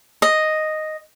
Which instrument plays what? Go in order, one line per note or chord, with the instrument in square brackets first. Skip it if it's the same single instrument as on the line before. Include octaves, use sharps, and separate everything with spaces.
[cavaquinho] D#5